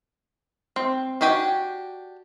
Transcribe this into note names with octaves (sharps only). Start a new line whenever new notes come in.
C4
D4 F#4 G4 G5 G#5